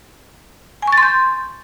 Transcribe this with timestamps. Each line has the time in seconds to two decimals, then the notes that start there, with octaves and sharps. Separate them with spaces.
0.82 G#5
0.87 C#6
0.92 A6
0.98 C6
1.03 G6